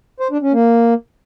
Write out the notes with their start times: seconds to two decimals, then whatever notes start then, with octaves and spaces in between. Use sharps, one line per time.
0.20 C5
0.31 D4
0.42 C#4
0.53 A#3